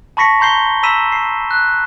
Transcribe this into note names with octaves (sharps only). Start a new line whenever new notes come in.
A5 B5 C#6 A#6 B6 C#7
A#5 C6 G6 C7 G7
A#5 B5 E6 B6 D#7 E7
C7
F#6